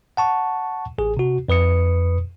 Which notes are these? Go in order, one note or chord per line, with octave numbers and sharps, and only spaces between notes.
F#5 A5 C#6
A1 G#4
C3 F#4
F2 B4 D#6 C#7